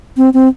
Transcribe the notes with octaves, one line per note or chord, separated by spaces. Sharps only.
C4
C4